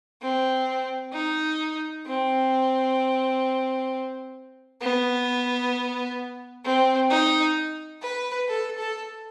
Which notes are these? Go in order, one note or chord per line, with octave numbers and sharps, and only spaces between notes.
C4
D#4
C4
B3
C4
D#4
B4
A4
A4